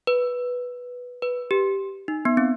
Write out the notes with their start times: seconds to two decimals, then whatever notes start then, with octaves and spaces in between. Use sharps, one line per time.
0.07 B4
1.22 B4
1.51 G4
2.08 D#4
2.25 B3
2.37 C4